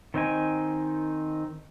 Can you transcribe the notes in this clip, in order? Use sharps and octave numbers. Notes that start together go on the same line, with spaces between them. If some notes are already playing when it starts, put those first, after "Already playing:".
D#3 C4 D#4 G#5